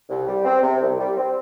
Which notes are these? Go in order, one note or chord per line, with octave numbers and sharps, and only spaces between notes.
C2
G3
C4
C3
C2
G3
C4